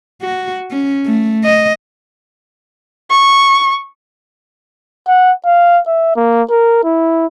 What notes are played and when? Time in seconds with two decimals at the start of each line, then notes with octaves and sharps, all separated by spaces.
0.22 F#4
0.71 C#4
1.06 A3
1.44 D#5
3.10 C#6
5.08 F#5
5.46 F5
5.87 E5
6.16 A#3
6.50 A#4
6.84 E4